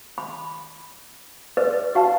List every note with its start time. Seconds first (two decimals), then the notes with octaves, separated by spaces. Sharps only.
0.18 B5
1.57 B4 D5
1.95 F#4 F5 A5